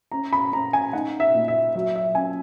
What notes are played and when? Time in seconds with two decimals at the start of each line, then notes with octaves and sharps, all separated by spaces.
0.12 C#4 A#5
0.33 B5
0.52 C#4 A#5
0.73 G#5
0.93 D#4 F#5
1.20 E5
1.35 A#2
1.48 E5
1.75 F#3 E5
1.96 E5
2.15 C#4 G#5